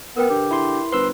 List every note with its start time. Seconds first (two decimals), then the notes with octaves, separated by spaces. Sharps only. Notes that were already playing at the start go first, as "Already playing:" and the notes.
0.17 B3 A#4 B4 G5
0.30 D3 G4
0.51 E4 G#4 C6
0.92 G1 B4 C5 C6 E6